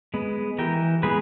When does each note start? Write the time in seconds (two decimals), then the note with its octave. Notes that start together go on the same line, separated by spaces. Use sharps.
0.14 G#3 B3
0.58 E3 G4 A#4
1.03 G#3 B3 G#4 B4